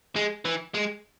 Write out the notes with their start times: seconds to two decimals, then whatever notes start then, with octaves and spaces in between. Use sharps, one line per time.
0.16 G#3
0.45 E3
0.75 G#3